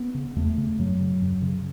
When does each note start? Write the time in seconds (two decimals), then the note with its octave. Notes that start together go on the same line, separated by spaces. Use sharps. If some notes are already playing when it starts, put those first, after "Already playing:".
Already playing: B3
0.14 C#3
0.36 E2 A3
0.57 C#3
0.79 F#2 F#3
1.00 C#3
1.22 F#2
1.42 C#3